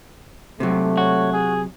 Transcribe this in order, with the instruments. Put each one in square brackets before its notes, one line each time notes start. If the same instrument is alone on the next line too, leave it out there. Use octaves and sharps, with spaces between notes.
[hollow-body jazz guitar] C3 F#3 [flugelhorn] A3
[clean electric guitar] F#4 [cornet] C#5
[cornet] G#4